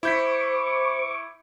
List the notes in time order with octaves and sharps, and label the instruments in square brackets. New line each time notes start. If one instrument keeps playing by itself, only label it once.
[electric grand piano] E4 G6 B6 [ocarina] C5 [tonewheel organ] C#6 D6